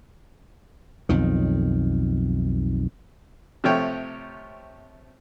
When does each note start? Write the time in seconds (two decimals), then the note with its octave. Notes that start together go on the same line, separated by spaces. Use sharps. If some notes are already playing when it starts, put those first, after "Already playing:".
1.09 B1 F2 D#3
3.64 C3 F3 A3 C#5 G5